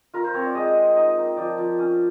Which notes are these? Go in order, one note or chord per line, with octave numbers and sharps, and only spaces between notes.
F4 A#4
C5
C4 C#5
D5
G#3 D#5
G#3
D#4 D#5
A#3
F3 D5
F3
C#4